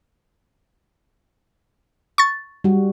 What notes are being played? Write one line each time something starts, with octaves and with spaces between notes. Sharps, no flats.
C#6 A6
G3 F#4